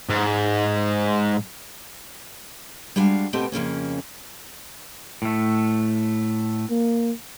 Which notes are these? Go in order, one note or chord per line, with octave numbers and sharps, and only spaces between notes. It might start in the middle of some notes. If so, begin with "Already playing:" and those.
G#2
G3 G#3 D4 F#4 F5
B2 A3 B3 C4 G4 D#5
F2 C#3 A#3 C#4
A2 A3
A#3